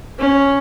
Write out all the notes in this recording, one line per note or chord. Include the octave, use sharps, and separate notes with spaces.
C#4